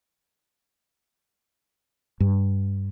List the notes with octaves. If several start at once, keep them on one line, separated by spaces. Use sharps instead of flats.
G2